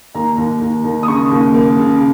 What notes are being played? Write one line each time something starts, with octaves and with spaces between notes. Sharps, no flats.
D#2 A#5
D#2
D#2
D#2
D#6
C#3 C#6
D#2
A#3
C#3